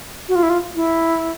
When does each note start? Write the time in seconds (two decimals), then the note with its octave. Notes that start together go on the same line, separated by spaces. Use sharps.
0.29 F#4
0.35 F4
0.43 E4
0.50 F4
0.75 E4